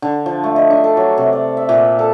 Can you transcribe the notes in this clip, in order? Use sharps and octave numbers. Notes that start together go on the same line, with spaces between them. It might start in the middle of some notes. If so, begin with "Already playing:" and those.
D3
F3
A3
D#5
D4
A4
F#3
C3
D5
E5
A#2
A4